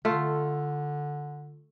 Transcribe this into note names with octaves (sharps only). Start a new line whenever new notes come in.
D3 A3 F4